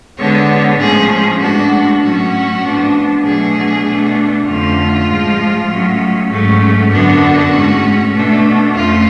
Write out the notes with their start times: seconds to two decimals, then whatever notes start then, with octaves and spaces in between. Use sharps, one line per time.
0.17 D3 G#3 B3 D4 C#5
0.78 A2 F3 G#3 C#4 G#4
1.40 A2 G#3 B3 D4 F#4
2.02 A2 F#3 C#4 F#4
2.63 A2 F3 B3 D4
3.23 B2 F#3 A3 D4 G#4
3.85 B2 A3 D4
4.46 F2 D3 F3 A3 C#4 F4
5.07 A2 F3 G#3
5.69 A2 F#3 C#4
6.29 G#2 F#3 A3 C#4
6.91 F#2 D3 F#3 B3 D4 F#4
7.52 A2 G#3 C#4
8.13 B2 A3 D4
8.74 F2 F3 A3 C#4 F4